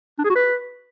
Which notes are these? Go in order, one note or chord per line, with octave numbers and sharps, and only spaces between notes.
D4
G#4
F#4
B4